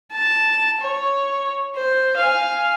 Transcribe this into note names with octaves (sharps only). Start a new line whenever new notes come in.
A5
C#5
C5
F5 G#5